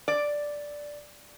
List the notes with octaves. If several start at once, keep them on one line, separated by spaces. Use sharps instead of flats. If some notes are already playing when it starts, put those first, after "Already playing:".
D5